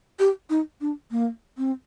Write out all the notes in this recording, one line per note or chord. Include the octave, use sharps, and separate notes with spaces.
G4
D#4
D4
A#3
C4